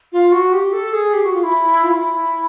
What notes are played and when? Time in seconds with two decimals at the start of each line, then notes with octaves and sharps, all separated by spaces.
0.12 F4
0.32 F#4
0.53 G4
0.72 A4
0.93 G#4
1.13 G4
1.23 F#4
1.33 F4
1.43 E4
1.83 F4
1.94 E4